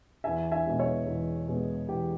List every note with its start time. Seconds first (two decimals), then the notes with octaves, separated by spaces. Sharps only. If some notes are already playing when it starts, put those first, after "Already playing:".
0.24 E2 E5 G#5
0.52 E5 G#5
0.66 B2 G#3 B3
0.79 C#5 E5
1.06 E2
1.48 B2 G#3 B3
1.89 E2 G4